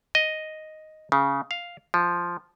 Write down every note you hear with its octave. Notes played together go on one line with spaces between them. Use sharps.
D#5
C#3
F5
F3